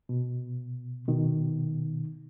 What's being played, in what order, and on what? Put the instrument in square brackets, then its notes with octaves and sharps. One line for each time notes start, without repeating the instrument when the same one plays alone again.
[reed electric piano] B2
B2 D#3